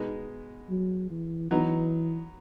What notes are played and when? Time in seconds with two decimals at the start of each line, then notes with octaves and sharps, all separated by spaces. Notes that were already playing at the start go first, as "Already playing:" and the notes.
Already playing: B2 G#3 B3 D#4
0.69 F#3
1.10 E3
1.51 E3 F#3 B3 D#4